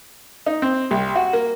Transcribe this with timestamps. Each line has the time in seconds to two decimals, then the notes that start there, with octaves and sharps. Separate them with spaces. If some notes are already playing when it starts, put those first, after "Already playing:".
0.46 D#4
0.62 C4
0.91 C2
1.16 F#4
1.33 A#3